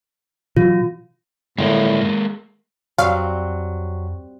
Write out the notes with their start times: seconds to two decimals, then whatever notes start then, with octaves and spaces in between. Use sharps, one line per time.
0.57 B2 E3 F#3 F4
1.58 G1 A2 G#3 A#3
2.98 F2 F#3 G3 C4 F5